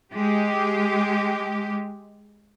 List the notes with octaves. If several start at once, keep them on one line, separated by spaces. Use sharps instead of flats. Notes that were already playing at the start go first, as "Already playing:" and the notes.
G#3 G4